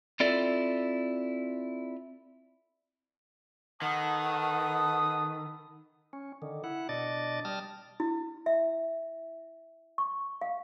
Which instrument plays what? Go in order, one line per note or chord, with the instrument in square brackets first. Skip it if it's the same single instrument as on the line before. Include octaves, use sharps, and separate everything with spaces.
[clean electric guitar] C4 E4 F4 A4 D5
[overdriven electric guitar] D#3 [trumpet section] A4 B4 A5 [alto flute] F#5 [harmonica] D#6
[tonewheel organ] C#4
D3 D#3
E4 F#5
B2 D4 D5 D#5 A6
G3 A5 D#6 F6
[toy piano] E4
E5
C#6
F5